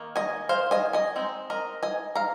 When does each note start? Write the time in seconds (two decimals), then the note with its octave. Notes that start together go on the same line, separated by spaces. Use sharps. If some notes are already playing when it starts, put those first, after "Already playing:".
Already playing: D#3 A#3
0.16 D#5 G#5
0.49 C5 F5
0.71 D#5 G#5
0.93 D#5 G#5
1.16 G#3 C4 D#4
1.50 A#4 D#5
1.83 D#5 G#5
2.15 F5 A#5